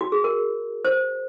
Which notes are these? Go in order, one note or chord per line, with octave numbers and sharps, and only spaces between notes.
F#4
G#4
A#4
C5